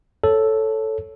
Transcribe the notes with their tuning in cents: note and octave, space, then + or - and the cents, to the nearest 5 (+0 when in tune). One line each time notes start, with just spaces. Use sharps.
A4 +0 C#5 +0